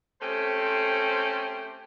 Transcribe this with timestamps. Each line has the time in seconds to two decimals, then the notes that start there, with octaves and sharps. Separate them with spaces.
0.21 A3 C4 C#4 G4 A4 C5